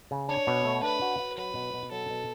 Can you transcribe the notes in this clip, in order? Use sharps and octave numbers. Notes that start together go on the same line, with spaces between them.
C#3
D4 C#5
B2
A3
D4 B4
F#4
F#4
F#3 B4
B2
B2
F#3 A4
B2